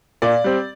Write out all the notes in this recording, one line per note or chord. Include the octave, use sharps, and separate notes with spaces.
A#2 D5
G3 C4